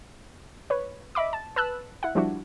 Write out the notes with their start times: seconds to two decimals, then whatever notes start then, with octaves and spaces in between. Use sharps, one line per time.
0.70 B4 C#5
1.15 D#5 E5 B5 D6
1.33 A5
1.56 B4 A5 E6 F#6
2.03 E4 F#5
2.15 F3 G3 D4 E4 F#4